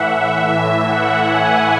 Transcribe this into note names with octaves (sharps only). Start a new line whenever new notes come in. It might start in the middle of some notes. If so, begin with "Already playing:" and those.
Already playing: A2 E3 E5 F#5
A2 E3 E5
F#5
G#5